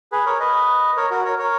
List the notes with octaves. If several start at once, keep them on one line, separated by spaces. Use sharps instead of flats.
G#4 B4
A#4 C#5
B4 D#5
A#4 C#5
F#4 A#4
A#4 C#5
A#4 C#5